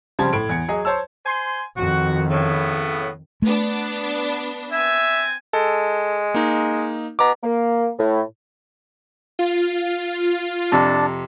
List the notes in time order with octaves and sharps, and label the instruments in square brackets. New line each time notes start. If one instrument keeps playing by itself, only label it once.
[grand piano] C#3 F3 G3 C4 A5 G#6
A2 G#6 D7
E2 G#6 C#7
F#3 G#4 D#5
C5 C#5 A5 E6
[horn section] C5 G#5 C6
[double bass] F2 D#3 [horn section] F#4
[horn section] A2 C#3 B3
[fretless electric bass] A3 [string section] B3 D4
[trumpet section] C4 G#5 [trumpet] E5
[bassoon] G#3 [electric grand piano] A4
[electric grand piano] A#3 D#4
[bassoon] B2 [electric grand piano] A#5 D6
[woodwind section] A#3
A2
[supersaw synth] F4
[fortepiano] F2 C3 [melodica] D4 A5